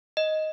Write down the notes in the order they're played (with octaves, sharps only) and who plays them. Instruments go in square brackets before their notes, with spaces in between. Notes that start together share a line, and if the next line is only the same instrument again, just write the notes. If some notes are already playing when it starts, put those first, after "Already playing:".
[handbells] D#5